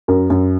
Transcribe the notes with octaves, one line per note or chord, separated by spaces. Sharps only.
F#2 A#4
F#2